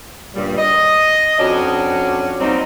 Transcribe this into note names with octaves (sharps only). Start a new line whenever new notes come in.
G2 A#2 C#3 G3
D#5
F2 C#4 D4 F#4
F#3 G3 A#3 C4 D#4